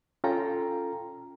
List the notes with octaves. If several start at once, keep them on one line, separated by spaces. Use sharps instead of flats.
C#4 F4 A4 G5 A#5